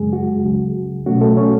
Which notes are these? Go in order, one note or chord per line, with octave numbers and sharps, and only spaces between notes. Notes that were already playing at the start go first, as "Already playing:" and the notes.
Already playing: F#2 C#3 F#3 G#3 G#4
F#4
C#2 C#3 F#3
B2 F#3 A3 C#4 F#4
A3 A4
C#4 C#5